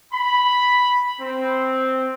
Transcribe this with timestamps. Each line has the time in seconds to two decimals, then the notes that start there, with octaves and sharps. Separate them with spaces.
0.13 B5
1.20 C4